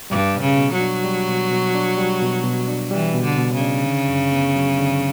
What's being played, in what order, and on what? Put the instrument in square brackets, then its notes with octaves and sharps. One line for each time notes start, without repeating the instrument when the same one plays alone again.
[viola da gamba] G2 [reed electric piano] G3
[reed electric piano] B2
[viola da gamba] C#3
[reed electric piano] B2
[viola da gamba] F#3
[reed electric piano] D4
G3
B2
B2
D4
G3
B2
B2
D4
[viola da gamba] E3 [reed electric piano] G3
[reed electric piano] B2
[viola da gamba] D3
[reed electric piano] B2
[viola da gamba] C#3
[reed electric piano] D4
D3
F#2
B3
F#3
D3